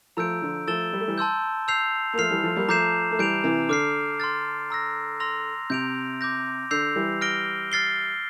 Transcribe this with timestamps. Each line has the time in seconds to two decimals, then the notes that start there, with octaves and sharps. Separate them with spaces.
0.17 F3 A3 A#5 E6 G6 D7
0.42 D3 F3
0.67 F3 A3 E6 A6 E7 G7
0.93 G3
1.00 A3
1.08 E3 G3
1.18 A5 C6 E6 G6
1.68 E6 G6 C7 F7
2.13 A#3
2.18 F3 A3 F6 C7 F7
2.31 E3 G3
2.43 F3 A3
2.56 G3 A#3
2.68 F3 A3 A#5 D6 G6 C7 E7
3.11 A3
3.19 E3 G3 G6 D7 F7
3.44 C3 E3
3.69 D3 D6 F6 C7
4.20 C6 F6 A6
4.70 A#5 E6 A#6
5.20 C6 E6 A#6 F7
5.70 C3 G6 D7 F7
6.21 D6 G6 A#6
6.71 D3 E6 G6 C7 F7
6.96 E3 G3
7.21 F6 A#6 D7 G7
7.72 F6 A6 C7 G7